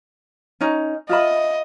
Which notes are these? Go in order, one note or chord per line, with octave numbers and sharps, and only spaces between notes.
C#4 D#4
F4 D#5 E5 B5